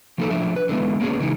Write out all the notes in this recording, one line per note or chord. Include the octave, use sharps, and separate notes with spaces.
F3 F#3 A#3 D#4 A4
A2 F3 D4 E5
B4
D3 E3 G#3 B3
A#3 B3 C#4 G#4
C#3 E3 G#3 D#4